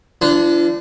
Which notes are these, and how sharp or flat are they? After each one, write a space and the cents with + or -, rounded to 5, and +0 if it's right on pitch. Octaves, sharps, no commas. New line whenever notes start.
F3 -45 D4 +0